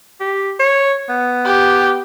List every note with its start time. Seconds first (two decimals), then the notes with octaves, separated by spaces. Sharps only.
0.20 G4
0.60 C#5
1.09 B3
1.46 G4